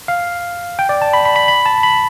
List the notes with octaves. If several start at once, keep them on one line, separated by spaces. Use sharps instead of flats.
F5
G5
D5
A5
B5
B5
B5
B5
A5
B5